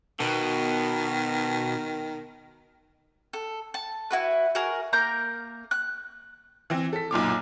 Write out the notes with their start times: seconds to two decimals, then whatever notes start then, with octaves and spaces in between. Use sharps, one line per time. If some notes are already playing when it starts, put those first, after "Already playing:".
0.20 B2 D#3
3.33 A4
3.74 A5
4.11 E4 F#4 B4
4.55 F#4 G#4 A#4
4.93 A#3 A#4 A#5 G6
5.71 F#6
6.70 E3 C4
6.93 A4 B6
7.11 B1 F#2 A#2 D6